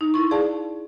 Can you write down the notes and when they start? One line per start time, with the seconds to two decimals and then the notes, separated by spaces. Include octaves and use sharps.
0.01 D#4
0.14 E4 C6 C#6
0.31 G#4 D5 F5 A5